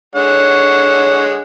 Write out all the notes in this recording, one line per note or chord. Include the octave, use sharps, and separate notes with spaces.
D3 G#3 C#5 F#5